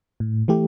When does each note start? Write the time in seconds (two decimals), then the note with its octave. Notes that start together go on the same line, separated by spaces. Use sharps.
0.20 A2
0.48 E3 A3 G4